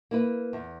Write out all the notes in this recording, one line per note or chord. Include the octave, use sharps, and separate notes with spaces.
A#3 E4 B4
E2